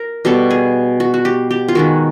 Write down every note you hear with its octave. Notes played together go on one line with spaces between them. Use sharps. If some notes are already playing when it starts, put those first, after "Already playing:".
Already playing: A#4
B2 G3 B3 A4
G#4
F#4
F#4
G4
G4
F4
D#3 G#3 B3 F#4